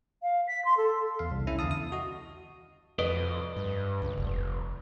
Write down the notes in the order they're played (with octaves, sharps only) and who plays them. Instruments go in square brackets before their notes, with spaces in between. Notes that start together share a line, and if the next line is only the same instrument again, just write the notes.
[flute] F5
B6
C6
A4
[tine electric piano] E2 F5
C2
C#4 E4 E5
E2 D3 F5 A5 D#6
D#6
F#4 D#5
[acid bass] F2 [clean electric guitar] B4 D5 D#5
[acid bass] G2
C#2
F1